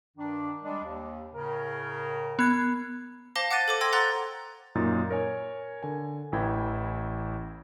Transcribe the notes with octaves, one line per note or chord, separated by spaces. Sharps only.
G2 D#3 D4
G3 G#3 D4
D#2
A2 C#3 A#4
B3 G#6
C5 F5 A5 D6 A#6 G7
F#5 D6 F#6 A6 D#7
A4 C5 D6
G5 C6 E6 G#6 A#6
F#5 A#5 C6 E6 F#6 A6
F#2 A#2 D#4 A6
A#4 C#5 G#5
D3 G#5
A1 E3 E4 G5 G#6